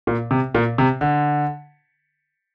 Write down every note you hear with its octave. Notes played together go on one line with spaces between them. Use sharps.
A#2
C3
A#2
C3
D3